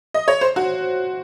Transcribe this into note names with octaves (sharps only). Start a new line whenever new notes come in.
D#5
C#5
C5
F#4